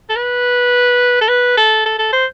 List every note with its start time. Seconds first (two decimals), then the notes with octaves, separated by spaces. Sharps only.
0.09 A4
0.16 B4
1.21 A4
1.29 B4
1.57 A4
1.86 A4
1.99 A4
2.13 C5